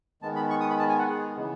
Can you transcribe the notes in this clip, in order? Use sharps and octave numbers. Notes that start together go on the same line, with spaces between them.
D#3 G#3 B3 A5
B5
C#6
D#6
B5
A5
G#5
F#5
G#4
C#3 E3 B3